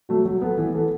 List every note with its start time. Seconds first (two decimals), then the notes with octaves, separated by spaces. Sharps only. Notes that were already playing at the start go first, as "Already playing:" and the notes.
0.09 F#3 A3 F#4
0.25 F#3
0.42 B3 A4
0.58 E3
0.74 B3 A4